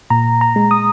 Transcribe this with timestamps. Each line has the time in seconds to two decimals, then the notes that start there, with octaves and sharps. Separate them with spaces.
0.10 A#2 A#5
0.41 A#5
0.56 G#3
0.71 D#6